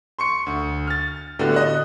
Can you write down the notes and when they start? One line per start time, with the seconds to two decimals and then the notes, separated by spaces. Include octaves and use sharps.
0.19 C6 C#6 C#7
0.46 D2
0.87 F6 A6
1.39 A2 D3 A3 B3 F#4 G4
1.54 D#5 F#6